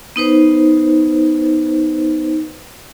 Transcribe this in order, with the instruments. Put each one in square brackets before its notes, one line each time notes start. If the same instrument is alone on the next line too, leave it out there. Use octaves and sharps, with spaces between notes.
[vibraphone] B3 D#4 B4 C5